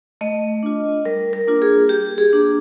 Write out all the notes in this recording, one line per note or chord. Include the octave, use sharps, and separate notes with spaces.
A3 D#5
D4 F4
G3 A#4
A#4
A#3 D4 F4
G#4
G3 G4
G#4
A#3 D4 F4